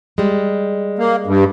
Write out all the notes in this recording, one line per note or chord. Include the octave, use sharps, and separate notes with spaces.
G3 G#3
A#3
G2